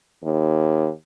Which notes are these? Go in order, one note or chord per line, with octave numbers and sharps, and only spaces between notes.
D#2